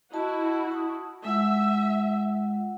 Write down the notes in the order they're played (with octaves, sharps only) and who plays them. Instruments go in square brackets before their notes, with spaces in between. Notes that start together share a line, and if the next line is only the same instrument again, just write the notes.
[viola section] E4 F#4 [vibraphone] D#5 A5
[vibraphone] A5 D#6
[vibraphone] G#3 F4 F#5 [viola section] E5